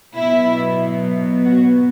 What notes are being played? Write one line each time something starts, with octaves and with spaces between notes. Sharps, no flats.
B2 F#3 B3 E4
F#4